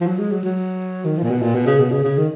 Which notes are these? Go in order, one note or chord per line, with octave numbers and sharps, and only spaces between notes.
F3
F#3
G#3
F#3
F#3
D#3
F3
A#2
B2
A#2
B2
C#3
B2
C#3
C#3
D#3